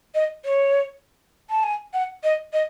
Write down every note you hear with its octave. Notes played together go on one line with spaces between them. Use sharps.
D#5
C#5
A5
G#5
F#5
D#5
D#5